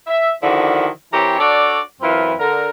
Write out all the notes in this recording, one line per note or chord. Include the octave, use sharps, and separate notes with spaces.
E5
D3 D#3 F3 D4 E4 F#4
E3 C4 G4 A#4 C#5
D4 F#4 A4 C#5 D5
F#2 E3 C4 E4 F4
D3 A#4